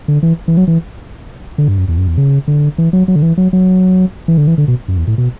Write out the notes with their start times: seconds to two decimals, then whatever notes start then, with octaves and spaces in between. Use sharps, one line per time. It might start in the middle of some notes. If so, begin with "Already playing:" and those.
0.08 D3
0.23 E3
0.48 E3
0.57 F#3
0.67 E3
1.58 D3
1.68 G2
1.78 F#2
1.88 E2
1.98 F#2
2.08 E2
2.18 C#3
2.48 D3
2.78 E3
2.93 F#3
3.08 F#3
3.16 D3
3.22 E3
3.38 F#3
3.53 F#3
4.28 E3
4.38 D3
4.47 E3
4.58 D3
4.68 B2
4.88 F#2
4.97 E2
5.07 A2
5.18 B2